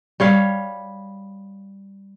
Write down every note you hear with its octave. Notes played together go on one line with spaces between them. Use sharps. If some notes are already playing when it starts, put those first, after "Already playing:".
G3 C#5 F5